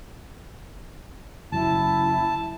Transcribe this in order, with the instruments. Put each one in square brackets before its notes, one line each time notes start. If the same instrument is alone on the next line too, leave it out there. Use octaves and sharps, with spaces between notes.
[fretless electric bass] F#1 F#3 [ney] E4 [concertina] A5